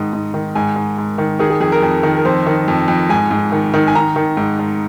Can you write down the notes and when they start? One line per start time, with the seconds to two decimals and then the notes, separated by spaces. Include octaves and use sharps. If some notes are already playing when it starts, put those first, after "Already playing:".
Already playing: G#2 D#3 D#5
0.13 G#2
0.34 D#3
0.55 G#2 G#5
0.76 G#2
0.98 G#2
1.18 D#3
1.39 D#3 G#4
1.50 G#4
1.60 F2 G#4
1.72 A#4
1.82 F2
2.03 D#3
2.17 A#4
2.25 F2 C5
2.46 D#3
2.68 F2
2.88 F2
3.09 G#2 G#5
3.31 G#2
3.52 D#3
3.73 D#3
3.88 G#5
3.95 D#3 A#5
4.16 D#3
4.37 G#2
4.59 G#2